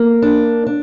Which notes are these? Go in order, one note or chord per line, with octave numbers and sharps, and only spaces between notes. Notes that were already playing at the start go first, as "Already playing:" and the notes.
Already playing: A#3
D4
D4